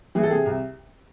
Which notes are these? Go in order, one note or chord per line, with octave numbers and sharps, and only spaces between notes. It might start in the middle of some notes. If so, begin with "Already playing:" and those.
E3 G#4
A4
C3 G#4
C2